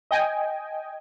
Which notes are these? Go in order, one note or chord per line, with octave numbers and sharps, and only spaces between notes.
D#5 G5 G#5